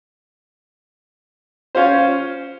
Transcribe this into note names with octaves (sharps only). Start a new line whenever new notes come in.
C#4 F4 C5